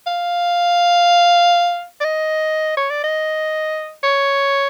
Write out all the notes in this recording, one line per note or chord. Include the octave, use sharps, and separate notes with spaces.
F5
D5
D#5
C#5
D5
D#5
C#5